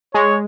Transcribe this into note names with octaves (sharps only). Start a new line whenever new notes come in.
G#3 C#5